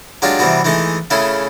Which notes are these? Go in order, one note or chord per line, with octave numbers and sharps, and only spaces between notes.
F#3 G#3 D4 F4 G4
C3 E3 G3 B3 F#4
E3 G#3 A3 D#4
C#3 A3 C#4 E4 G#4